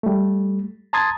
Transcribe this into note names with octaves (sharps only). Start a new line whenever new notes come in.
G3 A3
A5 A#5 C6 D#6 G#6 A6